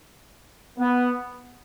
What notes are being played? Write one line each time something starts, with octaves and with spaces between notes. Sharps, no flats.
B3